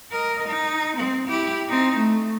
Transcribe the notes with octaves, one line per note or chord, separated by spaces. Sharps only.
A#4 D#5
D#4
C4
E4 G4
C4 D#4
A3